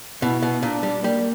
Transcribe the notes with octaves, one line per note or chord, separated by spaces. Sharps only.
B2 E4
B2
A#2 D4
G3
G3 A#3